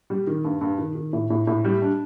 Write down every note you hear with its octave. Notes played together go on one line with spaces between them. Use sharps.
G3
D#3
G2
G2
D#3
D#3
A2
A2
A2
G3
D4